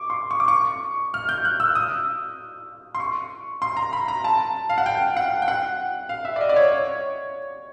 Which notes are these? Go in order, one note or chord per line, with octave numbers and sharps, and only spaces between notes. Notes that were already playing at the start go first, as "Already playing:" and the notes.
Already playing: C#6 D6
C6
C#6
D6
C#6
F6
G6
F#6
E6
D#6
C6
C#6
C6
A#5
B5
A#5
A5
F5
F#5
G5
F#5
G5
F#5
F5
E5
D5
D#5
D5
C#5
C#5